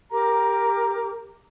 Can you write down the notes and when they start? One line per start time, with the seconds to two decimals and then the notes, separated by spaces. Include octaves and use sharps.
0.12 G4 A#4 A#5 D6